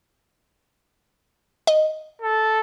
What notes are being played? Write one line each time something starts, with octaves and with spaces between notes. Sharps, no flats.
D#5
A4